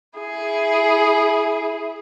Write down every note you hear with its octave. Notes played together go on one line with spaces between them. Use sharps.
E4 G#4